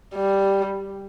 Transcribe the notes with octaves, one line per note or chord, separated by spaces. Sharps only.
G3